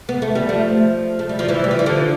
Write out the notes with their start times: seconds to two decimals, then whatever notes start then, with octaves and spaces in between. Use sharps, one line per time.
0.09 B3
0.22 A3
0.35 G3
0.49 F3 A3
1.19 A3
1.29 G3
1.39 F3
1.49 E3 G3
1.64 G3
1.71 F3
1.79 E3
1.86 D3 F3